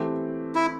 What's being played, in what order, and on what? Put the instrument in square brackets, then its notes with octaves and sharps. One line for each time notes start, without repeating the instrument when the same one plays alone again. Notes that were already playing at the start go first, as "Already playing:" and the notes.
Already playing: [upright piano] E3 A3 C4 G4
[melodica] E4